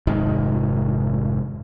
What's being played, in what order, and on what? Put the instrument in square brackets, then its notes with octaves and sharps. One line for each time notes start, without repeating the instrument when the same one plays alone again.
[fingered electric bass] F1 G#2 D#3